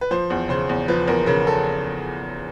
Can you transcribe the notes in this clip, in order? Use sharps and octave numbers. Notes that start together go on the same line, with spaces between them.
B4
F3 C5
E2
C#3 C5
E2
F3 B4
E2 A#4
C#3 A#4
A4